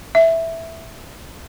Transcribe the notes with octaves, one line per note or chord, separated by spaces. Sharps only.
E5